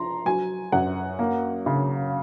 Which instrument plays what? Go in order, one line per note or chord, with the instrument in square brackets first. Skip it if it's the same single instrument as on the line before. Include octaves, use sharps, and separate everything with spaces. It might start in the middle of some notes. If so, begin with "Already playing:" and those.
Already playing: [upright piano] F3 A#5 C6
F#3 G#5
F#2 F#5
A#3
C#3